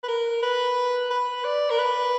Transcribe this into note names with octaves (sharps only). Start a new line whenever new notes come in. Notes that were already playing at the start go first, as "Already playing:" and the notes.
B4
A#4
B4
B4
D5
A#4
B4